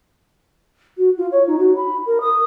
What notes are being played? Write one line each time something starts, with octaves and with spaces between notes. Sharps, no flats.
F#4
F4
C#5
D#4
F#4
B5
A#4
D#6